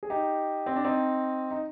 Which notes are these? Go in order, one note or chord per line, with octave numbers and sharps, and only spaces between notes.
G#4
D#4 G4
C4
D4
C4 D#4
D#4